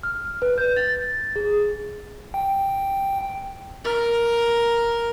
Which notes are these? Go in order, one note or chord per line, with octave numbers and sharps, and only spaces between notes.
F6
B4
G6
A6
G#4
G5
A#4